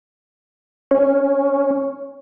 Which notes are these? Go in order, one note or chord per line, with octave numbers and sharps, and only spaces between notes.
C#4